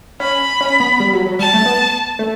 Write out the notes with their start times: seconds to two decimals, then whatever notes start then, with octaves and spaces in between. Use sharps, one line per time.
0.20 C#4 B5
0.61 C#4
0.80 B3
1.00 G3
1.13 F#3
1.26 F#3
1.39 G3 A5
1.53 A3
1.66 B3
2.19 A3